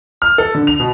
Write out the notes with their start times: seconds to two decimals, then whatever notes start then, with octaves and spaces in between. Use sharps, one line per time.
0.22 F6
0.38 A4
0.55 D3
0.67 F7
0.80 B2